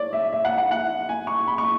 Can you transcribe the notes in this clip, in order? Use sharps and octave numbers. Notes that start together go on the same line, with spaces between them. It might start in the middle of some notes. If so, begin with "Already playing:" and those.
Already playing: C#5 D5
E5
E5
F#5
F#5
F#5
G#5
C#6
B5
C#6